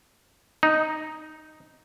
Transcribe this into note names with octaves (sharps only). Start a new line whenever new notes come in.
D#4